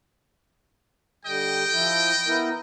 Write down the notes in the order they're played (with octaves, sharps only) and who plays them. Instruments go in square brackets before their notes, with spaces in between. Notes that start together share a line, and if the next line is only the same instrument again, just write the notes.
[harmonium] D3 G3 [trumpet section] D#5 G5
[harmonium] F3 E4
B3 E4 A#4